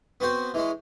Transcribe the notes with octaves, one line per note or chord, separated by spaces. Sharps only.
B3 C4 F#4 C5
E3 G#3 C#4